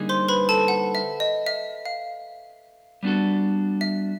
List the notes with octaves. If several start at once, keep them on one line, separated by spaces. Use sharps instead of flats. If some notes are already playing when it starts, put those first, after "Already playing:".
Already playing: D3 G3 A#3 D#4 G#4
C5 C6
B4 B5
A4 A5
F#5
E5
D#5
E5
F5
G3 B3 D4 F#4 A4
E5